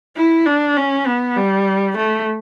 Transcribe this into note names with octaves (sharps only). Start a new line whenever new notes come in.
E4
D4
C#4
B3
G3
A3